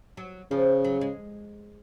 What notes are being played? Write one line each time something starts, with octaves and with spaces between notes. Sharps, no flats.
F#3
C#3 F3
F#3
G#3